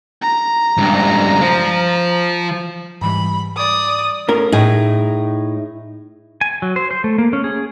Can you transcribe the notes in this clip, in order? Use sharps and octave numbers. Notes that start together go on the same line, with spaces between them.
A#5
C#2 G2
F3
G#2 E3 G3 B5
D5 D#6
A2 C#4 A#4
A2 D#4 G#4
G#5
F#3
C5
C5
A3
A#3
C#4
G#4